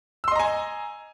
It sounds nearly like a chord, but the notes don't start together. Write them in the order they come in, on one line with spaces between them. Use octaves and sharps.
E6 C6 D#5 A#5 G#5